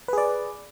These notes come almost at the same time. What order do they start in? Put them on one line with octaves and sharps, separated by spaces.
B4 G#4 D5